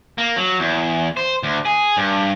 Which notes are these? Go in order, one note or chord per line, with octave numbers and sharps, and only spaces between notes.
A#3
F#3
E2
C5
D2
G#4
G2